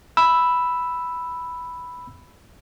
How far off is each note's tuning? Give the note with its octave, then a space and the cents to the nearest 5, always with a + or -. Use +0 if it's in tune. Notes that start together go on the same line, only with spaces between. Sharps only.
B5 +0 E6 +0